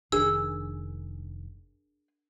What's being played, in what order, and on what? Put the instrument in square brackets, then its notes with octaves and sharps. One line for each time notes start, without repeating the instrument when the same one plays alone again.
[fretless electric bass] F1 D#3 [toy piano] D4 A#4 [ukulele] G#4 [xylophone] E6